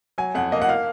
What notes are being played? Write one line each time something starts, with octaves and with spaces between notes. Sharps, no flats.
F#3 G#5
F2 F#5
A#3 D#5
F#5
A#3 F5